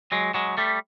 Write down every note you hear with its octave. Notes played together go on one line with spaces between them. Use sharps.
F#3 G#3
F#3 G#3
G3 A3